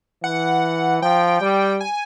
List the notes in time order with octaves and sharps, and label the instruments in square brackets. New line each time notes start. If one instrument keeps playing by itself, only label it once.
[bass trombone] E3 [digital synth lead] F#5
[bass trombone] F3 [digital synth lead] G5
[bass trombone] G3
[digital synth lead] G#5